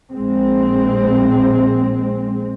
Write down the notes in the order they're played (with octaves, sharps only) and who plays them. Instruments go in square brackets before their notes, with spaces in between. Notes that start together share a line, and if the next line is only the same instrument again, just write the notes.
[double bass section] A#1 G#3 C4